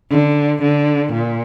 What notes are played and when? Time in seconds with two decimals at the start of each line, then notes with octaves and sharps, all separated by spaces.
0.10 D3
0.62 D3
1.13 A#2